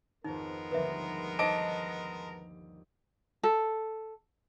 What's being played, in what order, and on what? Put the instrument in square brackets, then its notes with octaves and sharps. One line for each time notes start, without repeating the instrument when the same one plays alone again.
[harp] G#1 F2 [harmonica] G#3 B3 A#4 [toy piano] D#4
[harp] G1 D#2 F3 [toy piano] B4 E5
[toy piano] D#4 C5 D6 [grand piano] D#5 A5 D7
[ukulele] A4